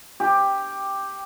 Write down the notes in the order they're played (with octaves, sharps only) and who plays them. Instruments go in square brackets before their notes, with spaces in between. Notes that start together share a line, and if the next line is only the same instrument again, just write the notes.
[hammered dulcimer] G4